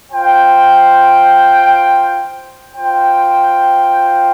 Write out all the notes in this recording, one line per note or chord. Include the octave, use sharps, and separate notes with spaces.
F4 C5 G5
F4 C5 G5